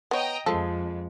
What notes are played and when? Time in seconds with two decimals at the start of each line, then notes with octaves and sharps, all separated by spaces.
0.11 B3 C#5 D#5 G5 A#5
0.46 F2 F3 G#3 A4